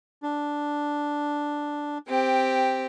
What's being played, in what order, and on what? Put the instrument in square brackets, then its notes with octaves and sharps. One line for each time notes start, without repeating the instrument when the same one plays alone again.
[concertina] D4
[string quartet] C4 G4